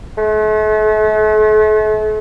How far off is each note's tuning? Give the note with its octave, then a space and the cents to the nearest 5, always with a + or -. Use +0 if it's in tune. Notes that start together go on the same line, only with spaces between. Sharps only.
A3 -40